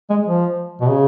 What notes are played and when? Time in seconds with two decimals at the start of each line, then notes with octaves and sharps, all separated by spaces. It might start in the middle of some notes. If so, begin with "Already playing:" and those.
0.10 G#3
0.27 F3
0.81 B2
0.89 C#3